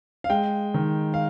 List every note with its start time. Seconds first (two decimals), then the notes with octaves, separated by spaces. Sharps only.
0.24 F5
0.30 G#3 G5
0.74 D#3
1.14 F5